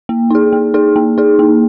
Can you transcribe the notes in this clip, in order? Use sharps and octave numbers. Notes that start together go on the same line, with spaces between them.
A#3
D#4 G#4
A#3
D#4 G#4
A#3
D#4 G#4
A#3